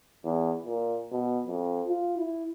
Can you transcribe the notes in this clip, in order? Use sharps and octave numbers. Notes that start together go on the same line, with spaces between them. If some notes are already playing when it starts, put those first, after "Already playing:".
E2
A#2
B2
F2
F4
E4